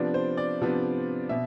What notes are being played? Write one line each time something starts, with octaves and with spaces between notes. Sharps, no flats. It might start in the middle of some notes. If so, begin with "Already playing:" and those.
Already playing: C3 F3 B3 D4 D5
C5
D5
C3 F3 B3 D4
B2 E5